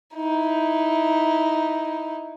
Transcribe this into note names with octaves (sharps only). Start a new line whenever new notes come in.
D#4 E4